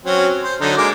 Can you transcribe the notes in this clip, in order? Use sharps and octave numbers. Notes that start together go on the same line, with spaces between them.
F#3 C4 C#4
C5
D3 F#3 D#4
G#3 A#3 D6